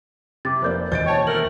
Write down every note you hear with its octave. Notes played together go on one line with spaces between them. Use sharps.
C3 D6 A6
F1 A#3 C5 D5 G6
D#2 B2 E3 C5 D#5 G6 A6 D7
C#5 G5 A5
A3 A#4 F#7